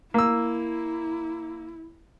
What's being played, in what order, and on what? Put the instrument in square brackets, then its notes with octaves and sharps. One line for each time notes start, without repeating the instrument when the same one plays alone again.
[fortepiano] A#3 E6 [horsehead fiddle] E4